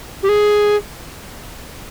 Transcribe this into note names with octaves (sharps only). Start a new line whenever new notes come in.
G4
G#4